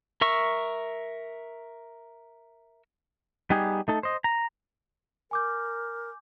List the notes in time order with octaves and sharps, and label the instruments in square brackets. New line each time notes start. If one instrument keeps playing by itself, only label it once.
[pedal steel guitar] A#4 E5 C#6 E6
[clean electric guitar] G3 B3 D#4 G4 G#4
A3 D#4 A4
C5 D#5
A#5
[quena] A#4 [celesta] G#5 D6 G6